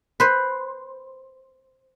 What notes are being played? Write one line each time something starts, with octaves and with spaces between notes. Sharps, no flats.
B4 C5